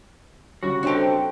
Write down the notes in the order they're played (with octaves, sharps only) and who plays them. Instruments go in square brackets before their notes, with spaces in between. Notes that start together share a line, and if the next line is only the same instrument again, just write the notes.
[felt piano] C#3 G3 C#4 [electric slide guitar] F#4 [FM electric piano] C#5
[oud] C4 D#4 A4 [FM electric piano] D4 C#5 C6 [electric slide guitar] F#4 G5